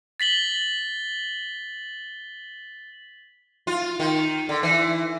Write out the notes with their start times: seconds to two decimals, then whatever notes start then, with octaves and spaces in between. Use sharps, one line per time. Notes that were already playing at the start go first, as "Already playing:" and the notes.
0.20 A6 B6 F#7 G7
3.67 F4
4.00 D#3
4.49 D3
4.63 E3